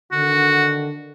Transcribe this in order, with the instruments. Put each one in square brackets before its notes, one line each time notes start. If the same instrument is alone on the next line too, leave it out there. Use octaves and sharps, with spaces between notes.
[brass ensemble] D3 D#3 [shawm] F#4